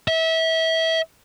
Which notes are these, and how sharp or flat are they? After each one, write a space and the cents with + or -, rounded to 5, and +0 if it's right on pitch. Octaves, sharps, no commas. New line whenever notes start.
E5 -25